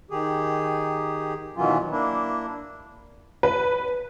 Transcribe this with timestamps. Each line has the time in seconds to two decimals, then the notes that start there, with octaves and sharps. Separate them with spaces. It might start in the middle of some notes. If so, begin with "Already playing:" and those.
0.11 D#3 G4 G#4
1.57 B2 D#3 E3 F#3 C#4 F4
1.91 A#3 D4 E4
3.43 B4